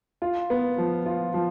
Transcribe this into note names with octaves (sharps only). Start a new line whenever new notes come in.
F4
B3
F3
F4
F3